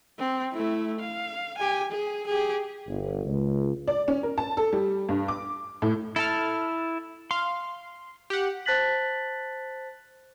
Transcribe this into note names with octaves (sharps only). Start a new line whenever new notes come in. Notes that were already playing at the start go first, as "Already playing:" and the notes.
C4
A3 E4
F5
G4 G#5
G#4
G4 G#4
G1
C#2
D5
C#4
A#4
A5
A4
G3
G2
D6
A2
E4 A4 A5 F6
F5 C6
G4 F#5
C5 A5 F#6 A6 B6 F#7